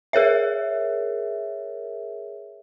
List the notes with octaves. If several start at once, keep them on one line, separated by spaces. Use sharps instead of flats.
G#4 A#4 C#5 E5